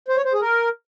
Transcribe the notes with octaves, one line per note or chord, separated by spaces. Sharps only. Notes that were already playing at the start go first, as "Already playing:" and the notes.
C5
C#5
C5
G#4
A#4